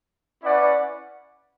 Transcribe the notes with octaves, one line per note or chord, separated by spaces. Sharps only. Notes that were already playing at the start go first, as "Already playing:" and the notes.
C#4 E4 B4 D5 F#5